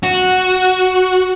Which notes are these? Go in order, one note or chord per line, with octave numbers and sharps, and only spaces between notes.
F#4